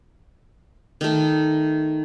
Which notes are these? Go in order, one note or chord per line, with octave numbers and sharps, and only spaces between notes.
D#3 A3